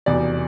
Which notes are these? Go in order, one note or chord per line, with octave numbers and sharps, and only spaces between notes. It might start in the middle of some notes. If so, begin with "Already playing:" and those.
F1 E2 B2 D5